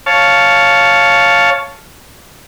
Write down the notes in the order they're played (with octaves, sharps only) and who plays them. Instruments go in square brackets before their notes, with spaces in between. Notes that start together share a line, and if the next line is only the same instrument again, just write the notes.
[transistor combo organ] C#5 F5 A5